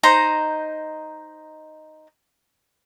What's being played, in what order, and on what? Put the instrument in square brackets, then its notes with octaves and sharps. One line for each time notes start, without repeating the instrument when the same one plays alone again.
[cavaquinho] D#4 C5 A#5